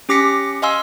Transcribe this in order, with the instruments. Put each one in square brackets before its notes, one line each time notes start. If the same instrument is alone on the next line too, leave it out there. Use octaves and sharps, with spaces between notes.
[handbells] C#4 G4 D6 A#6 B6 C#7
D#5 F5 G#5 C6 E6